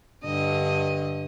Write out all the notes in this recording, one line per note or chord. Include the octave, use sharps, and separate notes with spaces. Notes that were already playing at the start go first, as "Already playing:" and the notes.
G2 D3 D#5